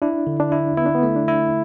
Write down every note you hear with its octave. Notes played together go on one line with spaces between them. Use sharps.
D4 E4
D3
D4
E4
B3 E4
D4
B3
A3
D4
E4